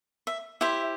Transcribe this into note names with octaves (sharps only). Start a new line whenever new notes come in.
E5
E4 G4 C5 E5